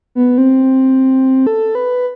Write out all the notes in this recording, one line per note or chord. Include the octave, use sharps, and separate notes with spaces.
B3
C4
A4
B4